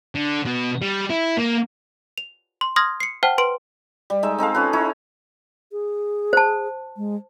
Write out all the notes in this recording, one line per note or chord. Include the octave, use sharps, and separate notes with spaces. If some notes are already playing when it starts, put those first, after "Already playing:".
D3
B2 B3
G3
E4
A#3
F7
C6
C6 D#6 F6 G#6 A#6
C7 C#7
C5 F#5 G5 A5 F6
B4 C6 D7
G3
G#3 D#4 E5
C4 D#4 A4 F5
C#4 F4 B4
D#4 E4 C#5
G#4
C5 A5
G#3